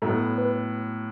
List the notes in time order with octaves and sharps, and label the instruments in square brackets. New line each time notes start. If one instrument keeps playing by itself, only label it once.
[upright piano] A2 F#3 B3 [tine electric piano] A4
[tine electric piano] B4